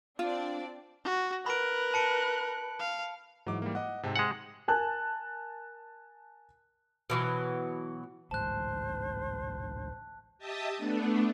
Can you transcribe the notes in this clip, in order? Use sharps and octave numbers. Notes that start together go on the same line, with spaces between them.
C4 D4 F4 D5
F#4
A#4 B4 B5 F#6 D7
A5 C#7 D7
F5
G#2 E3 F#3 D6
G3 A#3
D#5 F#5 D6
G#2 C3 C4 A5
G#3 F#5 G#5
A#4 G#5 A5 F#6
B2 E3 F#3
A1 D2 G#2 C5 A5 F#6
G4 D#5 E5 A5 D#6
A3 B3 D4